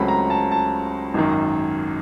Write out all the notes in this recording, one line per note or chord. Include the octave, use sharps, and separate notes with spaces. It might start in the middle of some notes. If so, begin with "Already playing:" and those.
Already playing: C#2 C#3 F#3 A3 C4 B5
A#5
A5
A5
G#1 F#2 D#3